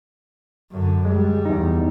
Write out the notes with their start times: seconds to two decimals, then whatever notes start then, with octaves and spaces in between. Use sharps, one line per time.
0.71 F#2 D3
1.05 G3 G#3
1.45 E2 D#4